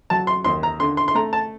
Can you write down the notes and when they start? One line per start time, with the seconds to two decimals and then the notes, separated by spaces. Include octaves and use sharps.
0.10 F#3 A5
0.27 C6
0.44 D#2 C6
0.63 A#5
0.80 D3 C6
0.97 C6
1.08 C6
1.15 A3 A#5
1.33 A5